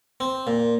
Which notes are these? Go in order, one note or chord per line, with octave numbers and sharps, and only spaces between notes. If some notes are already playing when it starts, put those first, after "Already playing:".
C4
A#2